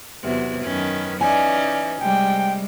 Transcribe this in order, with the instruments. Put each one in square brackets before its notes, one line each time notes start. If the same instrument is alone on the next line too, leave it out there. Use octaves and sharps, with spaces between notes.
[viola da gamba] E2 C3 F#3
[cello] F#2 B4 [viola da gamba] D#3 C#4
[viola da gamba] E3 C#4 D#4 [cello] D5 [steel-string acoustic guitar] G#5
[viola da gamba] C3 [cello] G3 G#3 [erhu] G5